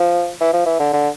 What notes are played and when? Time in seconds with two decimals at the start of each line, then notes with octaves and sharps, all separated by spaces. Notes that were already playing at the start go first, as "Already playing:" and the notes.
Already playing: F3
0.41 E3
0.53 F3
0.66 E3
0.79 D3
0.93 D3